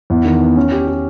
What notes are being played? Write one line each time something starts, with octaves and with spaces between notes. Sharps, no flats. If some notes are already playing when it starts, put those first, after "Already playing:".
E2
D#3
B3
C#4
G4
G4